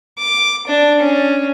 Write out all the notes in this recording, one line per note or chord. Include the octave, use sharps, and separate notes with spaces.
D6
D4
C#4